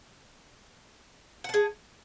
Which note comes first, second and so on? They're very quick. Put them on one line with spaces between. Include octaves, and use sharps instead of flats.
F#5 A5 G#4